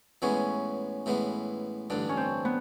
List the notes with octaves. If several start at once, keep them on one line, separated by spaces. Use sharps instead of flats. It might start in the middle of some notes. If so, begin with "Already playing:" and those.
A2 E3 G#3 B3 C#4
A2 E3 G#3 B3
A1 G2 D3 D4
C#4
C4
B3